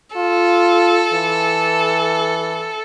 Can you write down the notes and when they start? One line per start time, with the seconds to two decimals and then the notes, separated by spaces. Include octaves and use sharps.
0.16 F4 A4
1.13 E3